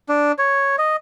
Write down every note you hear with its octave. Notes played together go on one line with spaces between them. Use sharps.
D4
C#5
D#5